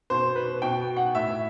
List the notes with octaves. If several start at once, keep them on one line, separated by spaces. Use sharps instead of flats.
B2 C5
B4
B2 G5
F#5
A2 E5